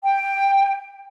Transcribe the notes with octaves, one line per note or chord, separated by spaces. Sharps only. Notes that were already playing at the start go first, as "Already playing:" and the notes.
G5